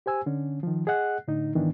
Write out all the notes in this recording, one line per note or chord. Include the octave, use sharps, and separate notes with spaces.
G4 C5 G#5 E6
D3 C#4
D#3 F3
G#4 D#5 F#5 F#6
A2 D3 D#4
G#2 D#3 E3 B3 D4